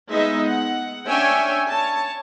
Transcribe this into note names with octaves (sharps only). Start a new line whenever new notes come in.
G#3 B3 D#4 D#5 E5
F#5
C#4 D4 C#5 E5 G5 G#5
C#5 A5